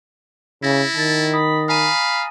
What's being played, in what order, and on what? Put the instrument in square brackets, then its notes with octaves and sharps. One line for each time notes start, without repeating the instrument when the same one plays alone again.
[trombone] C#3 [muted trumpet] E4 [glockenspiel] A6 A#6
[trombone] D#3 [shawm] A5
[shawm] B5 [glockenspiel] D#6
[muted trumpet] F5 [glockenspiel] G#5 A#5 D#7 [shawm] B5